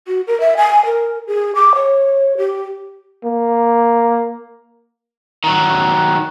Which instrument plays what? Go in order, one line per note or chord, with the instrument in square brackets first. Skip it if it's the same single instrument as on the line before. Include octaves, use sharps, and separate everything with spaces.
[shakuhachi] F#4
A#4
E5
G#5
A#4
G#4
D6
C#5
G4
[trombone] A#3
[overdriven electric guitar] D#3 F#3